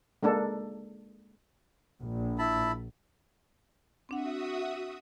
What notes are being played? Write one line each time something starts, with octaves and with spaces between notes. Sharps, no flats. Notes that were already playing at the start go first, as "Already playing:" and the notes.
G#3 A#3 D4 A4
A#1
E4 A5 B5
C4 D4 F#4 E5 F#5 D#6